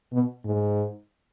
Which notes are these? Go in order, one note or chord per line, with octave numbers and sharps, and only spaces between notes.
B2
G#2